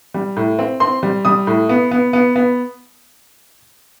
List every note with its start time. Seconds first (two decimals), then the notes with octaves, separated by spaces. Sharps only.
0.14 G3
0.37 A2
0.59 C4
0.80 C4 C6
1.03 G3
1.25 G3 D#6
1.47 A2
1.69 B3
1.91 B3
2.13 B3
2.36 B3